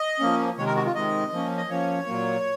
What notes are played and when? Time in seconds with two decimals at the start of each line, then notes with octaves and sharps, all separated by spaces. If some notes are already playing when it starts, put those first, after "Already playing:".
Already playing: D#5
0.20 F3 A#3 C#4
0.58 C3 D#3 G#3 C#5
0.66 A#4
0.76 F#4
0.86 F4
0.95 C3 D#3 G#3 D#5
1.32 F3 A#3 C#4
1.57 D#5
1.69 F3 A#3 C#4 C#5
2.06 A#2 F#3 A#3